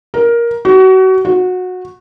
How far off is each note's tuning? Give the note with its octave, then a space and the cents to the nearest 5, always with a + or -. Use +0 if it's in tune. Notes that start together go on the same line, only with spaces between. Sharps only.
A#4 +10
F#4 +30
F#4 -20